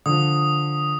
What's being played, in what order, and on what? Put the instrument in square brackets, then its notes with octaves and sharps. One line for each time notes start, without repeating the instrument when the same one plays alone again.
[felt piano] D3 F3 [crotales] D#6